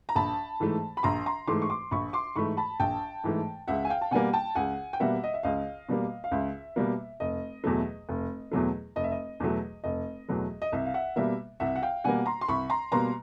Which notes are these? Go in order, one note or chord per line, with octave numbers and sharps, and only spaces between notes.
A#5
A#1 A5 B5
G#2 E3 A3
B5
A#1 A#5 C6
A#5 C6
G#2 E3 A3 C6 D6
C#6
C6 D6
A#1 B5 C#6
C6 D6
G#2 E3 A3 B5 C#6
A5 B5
A#1 G5 A5
G#2 E3 A3
C#2 E5 F#5
G#5
F5 G5
A5
B2 G3 A#3 F#5 G#5
G5 A5
C#2 F#5 G#5
G5
B2 G3 A#3 E5 F#5
D#5
E5
C#2 D#5 F5
B2 G3 A#3
F5
C#2 E5
B2 G3 A#3
F1 D#5
E2 B2 F#3 A3
F1
E2 B2 F#3 A3
F1 D#5
E5
D#5
E2 B2 F#3 A3
F1 D#5
E2 B2 F#3 A3
D#5
C2 E5
F5
E5 F#5
B2 G3 A#3 E5
C2 E5 F#5
F#5
F5 G5
B2 G3 A#3 F#5 G#5
A#5 C6
C6
C2 B5 C#6
A#5 C6
B2 G3 A#3 A#5 C6